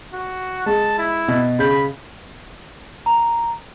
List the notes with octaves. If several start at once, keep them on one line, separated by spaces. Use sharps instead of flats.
F#4
G#3 A5
E4
B2
C#3 B5 G6
A#5